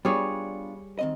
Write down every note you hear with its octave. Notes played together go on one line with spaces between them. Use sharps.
G3 B3 D4 F4 G#4 C#5
D#3 C4 D#5